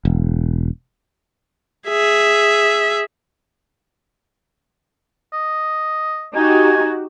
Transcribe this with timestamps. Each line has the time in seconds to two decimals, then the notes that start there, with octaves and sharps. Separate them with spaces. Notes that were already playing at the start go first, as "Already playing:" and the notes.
0.05 E1
1.89 G#4 E5
5.33 D#5
6.35 D#4 F#4 G4 G#5